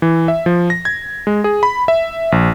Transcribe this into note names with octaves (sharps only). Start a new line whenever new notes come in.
E3
E5
F3
A#6
G#6
G#3
G#4
B5
E5
A#1